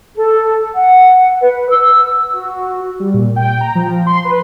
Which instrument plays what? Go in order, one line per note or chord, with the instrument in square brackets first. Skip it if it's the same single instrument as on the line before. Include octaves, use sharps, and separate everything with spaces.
[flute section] A4
F#5
B4
E6
F#4
[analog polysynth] G3
A#2
G5
A#5
F3
C6
B4